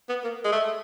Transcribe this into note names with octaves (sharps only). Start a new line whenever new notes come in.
B3
A#3
G#3
A3